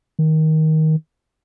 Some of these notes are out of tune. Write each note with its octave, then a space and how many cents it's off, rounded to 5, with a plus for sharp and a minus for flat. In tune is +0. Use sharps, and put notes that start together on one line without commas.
D#3 +15